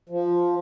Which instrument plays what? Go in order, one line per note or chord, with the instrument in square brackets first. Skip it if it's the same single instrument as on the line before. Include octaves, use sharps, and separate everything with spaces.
[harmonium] F3